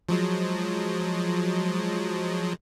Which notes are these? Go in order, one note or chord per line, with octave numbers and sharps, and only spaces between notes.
F3 F#3 G#3